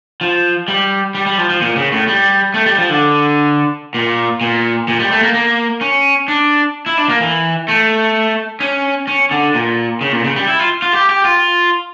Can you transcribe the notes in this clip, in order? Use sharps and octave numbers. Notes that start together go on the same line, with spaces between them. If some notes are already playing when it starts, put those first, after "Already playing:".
F3
G3
G3
G3
F3
F3
A#2
C#3
A2
G3
A3
G3
F3
D3
A#2
A#2
A#2
G3
A3
A#3
A#3
C#4
D4
E4
D4
A#3
E3
A3
C#4
C#4
D3
A#2
C#3
A#2
C#3
G3
E4
F4
F4
G4
G4
F4